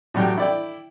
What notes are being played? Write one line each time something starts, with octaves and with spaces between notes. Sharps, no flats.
A2 F#3 G3 G5
E4 D5 G5